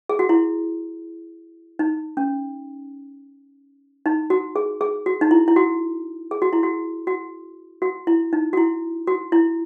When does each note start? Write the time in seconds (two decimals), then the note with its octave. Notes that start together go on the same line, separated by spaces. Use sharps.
0.09 G#4
0.19 F#4
0.29 E4
1.79 D#4
2.17 C#4
4.06 D#4
4.30 F#4
4.56 G#4
4.81 G#4
5.06 F#4
5.21 D#4
5.31 E4
5.48 E4
5.56 F#4
6.31 G#4
6.42 F#4
6.53 E4
6.63 F#4
7.07 F#4
7.82 F#4
8.07 E4
8.33 D#4
8.53 F#4
8.57 E4
9.07 F#4
9.32 E4